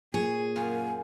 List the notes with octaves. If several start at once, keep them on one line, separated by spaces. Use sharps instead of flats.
A#2 G#4 C#5 G#5
F#2 F4 G#5